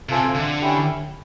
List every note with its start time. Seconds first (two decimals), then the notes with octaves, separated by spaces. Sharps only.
0.09 C3 F4 A4 C5 E5 G#5
0.35 D3
0.61 C#4 E4 G4